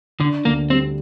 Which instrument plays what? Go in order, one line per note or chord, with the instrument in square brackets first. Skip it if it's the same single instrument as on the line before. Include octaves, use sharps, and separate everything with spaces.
[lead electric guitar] D3 [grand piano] D4
[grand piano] D2 [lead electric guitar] A#3
[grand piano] G3 [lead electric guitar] C4